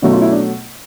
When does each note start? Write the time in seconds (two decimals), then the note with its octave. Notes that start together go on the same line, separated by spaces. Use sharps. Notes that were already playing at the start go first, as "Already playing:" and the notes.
0.02 B2 F#3 A3 C#4 E4
0.13 F4
0.22 E4
0.32 D4